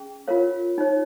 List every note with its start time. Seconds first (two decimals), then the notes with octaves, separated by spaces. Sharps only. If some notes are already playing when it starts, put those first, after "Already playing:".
Already playing: C#4 G#4
0.28 F4 A#4 C#5 F5
0.78 D#4 C#5